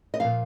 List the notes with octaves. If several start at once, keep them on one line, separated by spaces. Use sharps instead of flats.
D#5
A#2 F3 F5